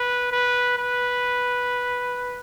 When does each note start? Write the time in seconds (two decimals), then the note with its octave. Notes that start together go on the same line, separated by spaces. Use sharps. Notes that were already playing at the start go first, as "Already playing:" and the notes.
Already playing: B4
0.32 B4
0.78 B4